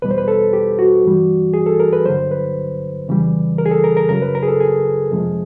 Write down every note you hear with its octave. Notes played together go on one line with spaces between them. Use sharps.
E2 B2 G3 B4
C5
B4
A4
G4
F#4
G2 E3 G3
G#4
A4
A#4
B4
G2 D3 F#3 C5
B4
F2 C#3 E3 G3
A#4
G#4
A4
A#4
A#4
F#2 C#3 F#3 A#4
B4
A#4
G#4
A4
G#4
F2 C3 F3 G#3